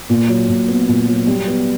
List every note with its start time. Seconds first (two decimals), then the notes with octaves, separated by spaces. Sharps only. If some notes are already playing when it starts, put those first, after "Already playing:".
0.10 A#2
0.28 F#3
0.49 A#2
0.68 B3
0.88 A#2
1.07 F#3
1.27 G3
1.48 B3